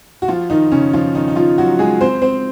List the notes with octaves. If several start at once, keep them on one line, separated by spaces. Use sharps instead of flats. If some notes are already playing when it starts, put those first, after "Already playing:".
F#4
F3 F4
D#3 D#4
C#3 C#4
F3 F4
D#3 D#4
D#4
F3 F4
F#3 F#4
G#3 G#4
C4 C5
C4 C5